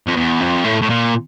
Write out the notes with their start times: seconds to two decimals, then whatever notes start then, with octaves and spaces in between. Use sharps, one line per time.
0.07 F2
0.16 E2
0.40 F2
0.64 A2
0.82 A2
0.90 A#2